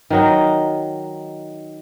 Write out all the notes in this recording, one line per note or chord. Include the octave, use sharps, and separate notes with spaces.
D#3 F#3 D#4